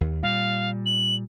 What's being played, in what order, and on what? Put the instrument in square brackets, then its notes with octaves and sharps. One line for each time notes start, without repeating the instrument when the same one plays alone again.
[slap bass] D#2
[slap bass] A#2 G3 [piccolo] F5
[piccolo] F#7